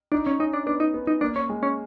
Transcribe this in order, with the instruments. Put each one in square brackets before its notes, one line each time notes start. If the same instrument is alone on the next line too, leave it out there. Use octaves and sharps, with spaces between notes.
[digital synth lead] D4 [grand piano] D#4
[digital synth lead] C#4
[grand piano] C#4 [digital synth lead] D#4
[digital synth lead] D4
[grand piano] B3 [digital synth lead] D4
[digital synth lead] D#4
[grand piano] B3
[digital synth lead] D#4
[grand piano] A#3 [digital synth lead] D4
[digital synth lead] C#4
[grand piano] G#3
[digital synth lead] C#4